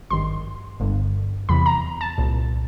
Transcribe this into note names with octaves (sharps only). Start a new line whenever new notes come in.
G#1 G2 D#3 C6
G1 G2 D3
E2 C3 E3 B5
A#5
A5
C2 A#2